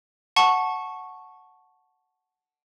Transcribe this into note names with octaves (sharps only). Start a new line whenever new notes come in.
F#5 A5 C#6